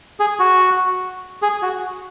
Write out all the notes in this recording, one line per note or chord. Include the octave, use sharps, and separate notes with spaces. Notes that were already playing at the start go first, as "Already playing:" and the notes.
G#4
F#4
G#4
F#4